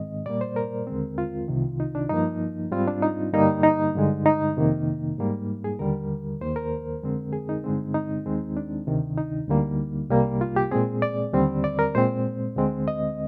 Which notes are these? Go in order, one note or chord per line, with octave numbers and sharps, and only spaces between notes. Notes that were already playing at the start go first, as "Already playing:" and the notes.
Already playing: G#2 D#3 G#3 C4 D#5
A#2 G3 A#3 D5
C5
A#4
D#2 D3 G#3 C4
F4
C2 C3 D#3
D#4
D4
G2 F3 A#3 D#4
G#2 G3 C4 F4
D4
D#4
G2 D3 G3 A#3 D#4
D#4
G2 D3 G#3
D#4
F2 C3 D#3 A#3
G#2 G3 A#3
G#4
D#2 D3 G3 A#4
D#2 D#3 A#3 C5
A#4
F2 D3 G#3 C4
G#4
D#4
G2 D3 G#3 C4
D#4
D#2 D#3 G#3 C4
D4
D2 C3 D#3
D#4
D2 D3 G3 A#3
C2 C3 G3 A#3
F4
G4
A#2 G#3 C4 G#4
D5
D#2 D3 G3 C4
D5
A#4
A#2 G#3 C4 C5
D2 D3 G#3 C4
D#5